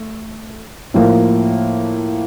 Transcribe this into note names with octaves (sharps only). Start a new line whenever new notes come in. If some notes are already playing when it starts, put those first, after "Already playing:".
Already playing: A3
A2 F3 A#3